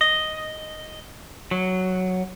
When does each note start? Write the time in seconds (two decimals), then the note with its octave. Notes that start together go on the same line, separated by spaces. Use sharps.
0.01 D#5
1.51 F#3